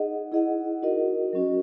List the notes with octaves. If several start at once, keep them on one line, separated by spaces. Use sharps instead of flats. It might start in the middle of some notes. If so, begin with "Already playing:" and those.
Already playing: D#4 G#4 D#5 F#5
E4 G#4 D#5 F#5
D#4 F#4 A#4 D#5
F#3 C#4 F#4